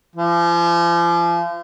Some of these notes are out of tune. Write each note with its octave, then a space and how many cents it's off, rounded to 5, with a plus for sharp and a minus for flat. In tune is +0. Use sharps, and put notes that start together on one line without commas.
F3 -40